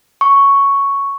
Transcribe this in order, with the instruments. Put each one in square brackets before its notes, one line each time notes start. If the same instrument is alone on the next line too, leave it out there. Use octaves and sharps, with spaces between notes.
[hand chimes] C#6